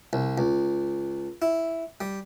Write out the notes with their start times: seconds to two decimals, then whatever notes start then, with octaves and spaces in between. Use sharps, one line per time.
0.13 C2
0.38 C#2
1.42 E4
2.01 G3